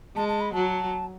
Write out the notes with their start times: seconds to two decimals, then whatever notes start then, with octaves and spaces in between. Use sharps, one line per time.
0.16 G#3 A5
0.29 A5
0.41 B5
0.53 F#3 A5